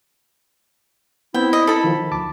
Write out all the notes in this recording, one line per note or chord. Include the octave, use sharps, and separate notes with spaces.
B3 C4 E4 G5
D#5
D#4 A4 B5
D#3 F3
D2 A5 D6